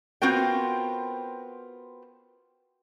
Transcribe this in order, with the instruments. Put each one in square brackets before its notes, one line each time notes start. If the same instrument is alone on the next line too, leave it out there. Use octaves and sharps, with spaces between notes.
[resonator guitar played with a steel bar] B3 C4 F4 F#4 A#4 G5